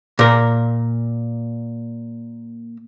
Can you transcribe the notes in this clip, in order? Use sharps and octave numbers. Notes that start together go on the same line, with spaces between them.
A#2 A#4